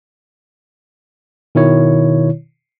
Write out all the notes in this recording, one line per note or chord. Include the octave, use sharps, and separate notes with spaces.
B2 D#3 E4 C#5